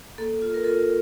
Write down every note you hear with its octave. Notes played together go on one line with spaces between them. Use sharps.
A#3 A4
F4
A#4
F4 A4